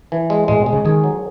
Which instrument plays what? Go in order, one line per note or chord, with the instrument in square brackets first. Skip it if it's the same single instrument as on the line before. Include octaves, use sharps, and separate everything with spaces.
[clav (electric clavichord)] E3
G#3
[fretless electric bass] A2 [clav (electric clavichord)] G#3
[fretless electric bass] B2
[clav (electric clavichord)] G#3
[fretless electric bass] C#3
[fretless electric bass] D#3 [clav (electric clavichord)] G#4
[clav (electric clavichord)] F#3